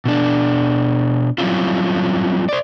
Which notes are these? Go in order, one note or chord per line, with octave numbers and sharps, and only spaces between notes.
B2 D4
F#3 G3 C4 C#4 E4 F4
C5 D5